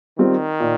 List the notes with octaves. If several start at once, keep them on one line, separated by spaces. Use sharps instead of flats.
D#3 G3 C4 F4
A#2